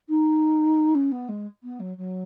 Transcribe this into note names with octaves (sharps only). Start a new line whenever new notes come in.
D#4
C#4
B3
G#3
B3
F#3
F#3